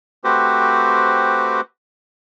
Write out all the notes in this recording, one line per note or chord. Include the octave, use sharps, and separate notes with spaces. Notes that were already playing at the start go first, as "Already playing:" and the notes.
A3 C4 F#4 G4 B4 C5